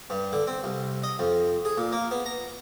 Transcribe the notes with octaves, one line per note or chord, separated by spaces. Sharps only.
G2
D3
C4
C2
D#5
F2
G#4
A#2
A#3
B3
A#5